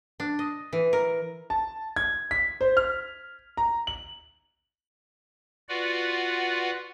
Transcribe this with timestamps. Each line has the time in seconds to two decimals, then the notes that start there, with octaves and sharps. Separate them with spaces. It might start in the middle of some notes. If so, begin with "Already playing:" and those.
0.20 D4
0.39 D#5
0.73 E3
0.93 A#4
1.50 A5
1.96 G#6
2.31 B6
2.61 C5
2.77 F6
3.57 A#5
3.87 F#7
5.69 F4 F#4 B4 D5 F#5